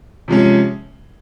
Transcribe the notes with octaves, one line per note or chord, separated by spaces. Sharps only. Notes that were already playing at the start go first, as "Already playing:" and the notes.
C3 F3 G#3 C#4